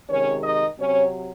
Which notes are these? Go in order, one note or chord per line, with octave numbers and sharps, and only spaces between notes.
C3 D#3 G#3 C#4 C#5
D#4 D#5
C3 F#3 C4 C#4 C#5